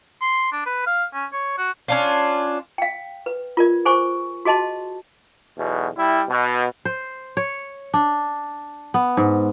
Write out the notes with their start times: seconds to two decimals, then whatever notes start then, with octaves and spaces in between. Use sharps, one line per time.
0.21 C6
0.52 D4
0.66 B4
0.86 F5
1.14 C#4
1.33 C#5
1.58 F#4
1.88 C#4 D4 F4
2.78 F5 G5
3.26 B4
3.57 F4 A#4 D5
3.85 G#4 C5 G#5 C#6
4.45 F#4 G#4 D#5 A5 C6
5.58 B1 E2 B2
5.96 G3 E4
6.28 B2
6.85 C5
7.37 C#5
7.94 D4
8.94 B3
9.17 G#2